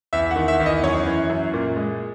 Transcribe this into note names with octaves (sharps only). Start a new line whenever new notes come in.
E2 E5
F#5
D#3
E5
E2
D#5
F#2 C#5
E3
F#2
A#2
G#3